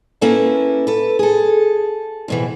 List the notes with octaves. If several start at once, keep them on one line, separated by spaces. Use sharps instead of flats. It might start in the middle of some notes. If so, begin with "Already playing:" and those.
A#3 C#4 E4 A4 B4
A4 B4
G#4 A4
F2 B2 E3